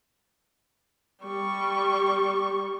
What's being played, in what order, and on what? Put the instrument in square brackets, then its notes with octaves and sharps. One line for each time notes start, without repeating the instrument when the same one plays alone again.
[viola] G3 C#6